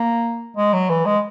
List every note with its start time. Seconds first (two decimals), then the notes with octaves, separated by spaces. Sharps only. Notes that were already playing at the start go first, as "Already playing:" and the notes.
Already playing: A#3
0.57 G#3
0.73 F#3
0.89 E3
1.05 G#3